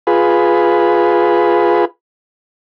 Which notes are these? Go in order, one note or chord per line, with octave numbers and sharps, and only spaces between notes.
F4 G#4 B4